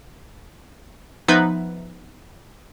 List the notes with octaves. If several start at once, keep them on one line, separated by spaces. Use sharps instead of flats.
F3 B3 D#4 B4 E5